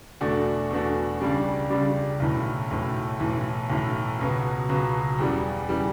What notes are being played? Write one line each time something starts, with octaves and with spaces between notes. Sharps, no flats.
E2 B2 A3 D4 F#4
E2 B2 A3 D4 F#4
C#2 C#3 G3 D4
C#2 C#3 G3 D4
B1 A2 E3
B1 A2 E3
B1 A2 E3
B1 A2 E3
C#2 B2 F#3 B3
C#2 B2 F#3 B3
E2 C#3 E3 G3
C#3 E3 G3